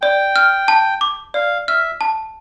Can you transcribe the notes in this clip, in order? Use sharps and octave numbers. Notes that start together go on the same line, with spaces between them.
D5 G5
F6
A5
D6
D5 F5
E5 F6
A5